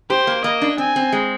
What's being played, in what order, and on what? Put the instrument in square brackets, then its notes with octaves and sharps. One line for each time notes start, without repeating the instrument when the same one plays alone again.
[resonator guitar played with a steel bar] G4 [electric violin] C5
[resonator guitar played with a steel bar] A#3
[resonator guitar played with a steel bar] A#3 [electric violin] D#5
[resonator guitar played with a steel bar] D4
[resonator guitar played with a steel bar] C4 [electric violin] G#5
[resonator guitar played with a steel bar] C4
G#3